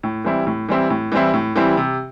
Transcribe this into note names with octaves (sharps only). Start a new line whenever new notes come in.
A2
E3 G3 C4 E4
A2
E3 G3 C4 E4
A2
E3 G3 C4 E4
A2
E3 G3 C4 E4
C3